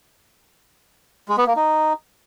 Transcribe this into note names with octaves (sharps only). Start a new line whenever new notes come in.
G#3
B3
A#3
D#4